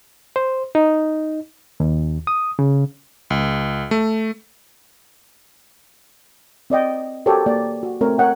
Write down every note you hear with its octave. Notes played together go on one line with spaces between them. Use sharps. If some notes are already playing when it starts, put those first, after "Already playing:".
C5
D#4
D#2
D#6
C#3
C#2
A3
C4 D5 D#5 G5
F#4 G4 A4 A#4 C5 C#5
A#3 D5
F#4
A3 C4 A#4 C#5
A#4 C#5 F#5 G5